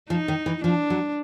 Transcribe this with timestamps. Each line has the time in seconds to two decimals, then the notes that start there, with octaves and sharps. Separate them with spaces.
0.10 F3 D#4
0.28 D#3
0.46 E3
0.64 F3 D4
0.90 F#3